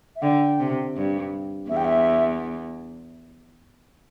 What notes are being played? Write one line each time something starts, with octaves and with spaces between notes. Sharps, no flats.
E5
D3 G5
C3
G2
E2 E5
G5
E5